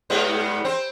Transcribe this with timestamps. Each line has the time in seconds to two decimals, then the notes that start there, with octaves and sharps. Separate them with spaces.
0.10 G#2 G3 B3
0.65 C4 C5